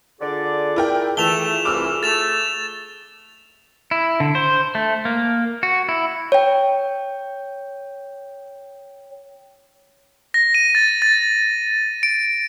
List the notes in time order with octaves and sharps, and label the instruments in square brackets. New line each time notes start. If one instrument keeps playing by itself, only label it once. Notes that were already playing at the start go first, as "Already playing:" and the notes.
[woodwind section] D3 D5 [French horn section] F4 G#4
[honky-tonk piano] E4 A#4 G5
[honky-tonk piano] E3 [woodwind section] A3 [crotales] E7 F7 G7
[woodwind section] C2 E3 [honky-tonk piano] D6 E6 F6
[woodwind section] A3 [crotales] A6 E7 F7
[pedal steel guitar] E4
D3
C5
A3
A#3
F#4
E4
[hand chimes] C#5 G5
[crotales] A#6
D#7
A6
A6
D7